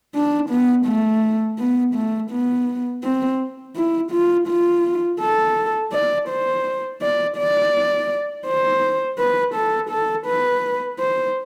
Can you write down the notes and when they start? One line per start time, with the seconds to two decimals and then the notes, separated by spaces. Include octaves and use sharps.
0.14 D4
0.50 B3
0.86 A3
1.58 B3
1.95 A3
2.31 B3
3.03 C4
3.76 E4
4.12 F4
4.48 F4
5.20 A4
5.92 D5
6.29 C5
7.01 D5
7.37 D5
8.46 C5
9.18 B4
9.54 A4
9.90 A4
10.27 B4
10.99 C5